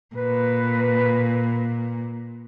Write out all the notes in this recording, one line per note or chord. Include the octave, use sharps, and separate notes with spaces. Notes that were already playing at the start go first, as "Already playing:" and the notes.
A#2 B4